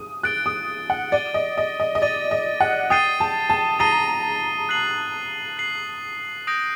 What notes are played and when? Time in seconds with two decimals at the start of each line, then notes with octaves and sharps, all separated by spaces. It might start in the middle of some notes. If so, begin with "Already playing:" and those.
Already playing: D#6
0.23 F#6 A6 D7 G7
0.46 D#6
0.90 F#5
1.12 D5 A6 D#7 G7
1.34 D#5
1.58 D#5
1.80 D#5
1.95 D#5
2.02 D5 A6 D#7 G7
2.31 D#5
2.60 F#5
2.90 G5 D#6 A6 C7 D#7 G7
3.20 A5
3.50 A5
3.79 A#5 D#6 A6 C7 D#7 G7
4.69 F#6 C7 F#7
5.57 F#6 C7 F#7
6.47 D#6 G6 A#6 D7